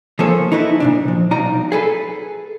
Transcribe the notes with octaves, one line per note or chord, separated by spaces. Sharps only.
F3 A#3 F4 G#4 A4 C#5
D#4 E4 F#4 B4
A#2 C#3 D4
F3
B1 D#4 F#4 D5 A#5
G#4 A4 B4